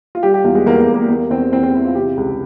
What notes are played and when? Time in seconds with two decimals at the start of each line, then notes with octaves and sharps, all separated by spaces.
0.15 F4
0.23 G3 G4
0.34 G4
0.44 E2 F4
0.55 G#3
0.66 E2 A#3
0.81 A#3
0.88 E2
0.94 A#3
1.09 E2 A#3
1.30 E2 C4
1.52 E2 C4
1.63 C4
1.74 E3 E4
1.85 F4
1.95 C3 G4
2.17 C#2